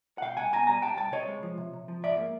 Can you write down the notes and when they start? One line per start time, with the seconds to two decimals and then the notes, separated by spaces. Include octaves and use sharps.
0.18 F#5
0.22 B2 F5 G5
0.37 C2 F#5 G#5
0.52 B2 G#5 A#5
0.67 G3 G#5 A#5
0.82 C2 G5 A5
0.97 C2 G5 A5
1.12 C3 C#5 D#5
1.28 G#3
1.43 F3
1.58 C3
1.73 C3
1.88 F3
2.03 G#2 D5 E5
2.18 A#3